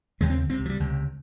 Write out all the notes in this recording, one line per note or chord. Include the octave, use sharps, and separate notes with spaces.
D#2 C#3 G#3
C4
C#2 C3 C4
F3
G3
C#2 C3